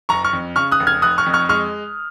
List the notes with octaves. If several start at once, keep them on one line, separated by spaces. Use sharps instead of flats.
F#1 A#5 C#6
C#6 F6
F2
C#3 C#6 F6
D#6 F#6
F1
F6 G#6
F1 D#6 F#6
C#6 F6
F2
C#6 F6
G#3 C#6 F6